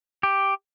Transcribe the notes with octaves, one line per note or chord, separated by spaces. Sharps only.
G4